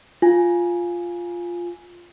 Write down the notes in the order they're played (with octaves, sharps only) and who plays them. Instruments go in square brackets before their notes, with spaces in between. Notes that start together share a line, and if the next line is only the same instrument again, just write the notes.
[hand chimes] F4 G#5